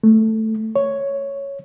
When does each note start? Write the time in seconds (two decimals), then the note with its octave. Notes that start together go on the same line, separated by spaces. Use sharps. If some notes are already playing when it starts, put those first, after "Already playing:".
0.04 A3
0.76 C#5